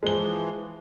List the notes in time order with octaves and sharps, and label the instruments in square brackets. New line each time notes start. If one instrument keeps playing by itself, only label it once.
[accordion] E3 F3 [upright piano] G#3 G7